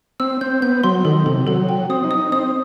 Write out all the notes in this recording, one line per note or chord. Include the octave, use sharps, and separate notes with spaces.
C4 E6
C4 G6
B3 G6
F#3 C6
D#3 A4
C3 A4
F#3 A4
G5
C4 D#6
D#4
D#6
D#4
C4 D#6